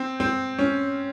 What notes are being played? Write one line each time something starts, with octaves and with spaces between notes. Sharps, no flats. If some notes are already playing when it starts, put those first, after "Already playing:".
Already playing: C4
C4
C#4